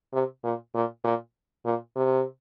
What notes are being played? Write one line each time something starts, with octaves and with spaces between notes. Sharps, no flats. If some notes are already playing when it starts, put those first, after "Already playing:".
C3
A#2
A#2
A#2
A#2
C3